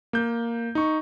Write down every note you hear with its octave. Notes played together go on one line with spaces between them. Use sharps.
A#3 G6
D#4 C#6